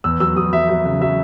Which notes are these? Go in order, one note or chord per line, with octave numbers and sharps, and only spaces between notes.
E2 E6
F#3 E6
F#3 D#6
F#3 E5
F#3 E5
C#3 E5
F#3 E5